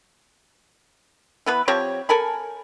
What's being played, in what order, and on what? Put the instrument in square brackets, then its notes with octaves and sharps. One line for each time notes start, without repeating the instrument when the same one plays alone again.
[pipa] E3 B3 B4
F3 C4 G4 C#5
A4 A#4 G#5 B5